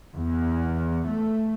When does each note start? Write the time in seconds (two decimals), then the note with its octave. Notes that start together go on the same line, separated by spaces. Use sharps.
0.15 E2
1.08 A3